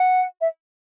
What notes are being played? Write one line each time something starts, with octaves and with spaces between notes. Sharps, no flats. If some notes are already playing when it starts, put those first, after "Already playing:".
Already playing: F#5
E5